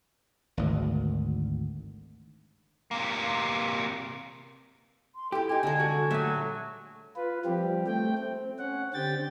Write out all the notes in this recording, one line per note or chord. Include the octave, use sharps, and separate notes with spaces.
G#1 D2
C3 A#3
C6
E4 G4 A4
D#4 G4 G#5
C2 D3 G#3
F#4 A4
A#2 F#3 G3 A3 E5 G#5
F4 B4
F3 G3 C4 G4
A3 G5
C4
C#4 F#5
D3 C4 G4 G5 A6